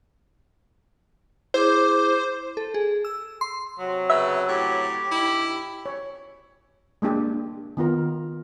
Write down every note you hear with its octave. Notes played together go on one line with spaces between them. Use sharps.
E4 G#4 C5 D6
A4
G#4
E6
C6
C3 F#3
C#3 B4 E5
A2 G4
G2 D#4 E4
C#5
G#3 A#3 D4 G4
D#3 B3 F4 A#4